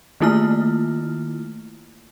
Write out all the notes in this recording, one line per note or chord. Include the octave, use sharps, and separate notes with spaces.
D#3 A3 A#3 E4 F4 F6